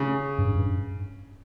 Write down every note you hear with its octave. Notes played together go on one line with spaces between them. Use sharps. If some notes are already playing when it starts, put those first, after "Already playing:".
Already playing: C#3
G2
G2